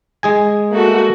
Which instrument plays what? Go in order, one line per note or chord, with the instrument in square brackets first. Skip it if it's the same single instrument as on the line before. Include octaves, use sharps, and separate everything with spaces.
[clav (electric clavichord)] G#3 G#4 G#5
[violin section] A3 A#3 F#4